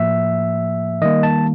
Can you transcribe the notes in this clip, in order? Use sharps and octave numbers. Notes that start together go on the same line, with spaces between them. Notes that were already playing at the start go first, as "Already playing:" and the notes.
Already playing: A2 F3 A#3 E5
D#3 G3 A#3 D#5
A5